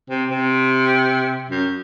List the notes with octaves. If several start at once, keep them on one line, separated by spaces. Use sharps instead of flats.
C3
C3
F#2